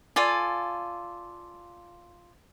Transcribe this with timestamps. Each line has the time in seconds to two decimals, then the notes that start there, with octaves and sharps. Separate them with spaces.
0.16 F4 A4 D5 G#5